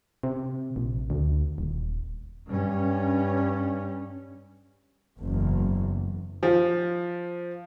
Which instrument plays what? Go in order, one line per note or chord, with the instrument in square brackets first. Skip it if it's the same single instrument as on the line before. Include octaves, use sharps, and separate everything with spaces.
[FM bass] C3
A#1
D2
D#1
[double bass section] G2 C#4
F#1 E2
[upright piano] F3